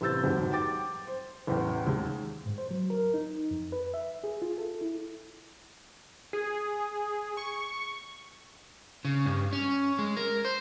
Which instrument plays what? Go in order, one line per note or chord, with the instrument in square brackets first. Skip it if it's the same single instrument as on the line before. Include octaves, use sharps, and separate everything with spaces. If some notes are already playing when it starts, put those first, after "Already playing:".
[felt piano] A1 C3 C5 E6 G6 A6
G1 E2 G#2 F#3 G3
G5 D6 A6
C5
A1 E2 G5
D#2 G#3
[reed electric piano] G#2
C5
F#3
A#4
D#4
F2
B4
E5
G#4
F4
A4
E4
[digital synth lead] G#4
C#6
[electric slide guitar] C#3
G2
C#4
G#3
A#4
C5